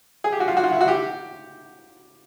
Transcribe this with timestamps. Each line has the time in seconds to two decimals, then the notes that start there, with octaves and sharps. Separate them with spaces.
0.24 G#4
0.32 G4
0.40 F#4
0.48 F4
0.57 F#4
0.64 F4
0.73 E4
0.81 F#4
0.88 G4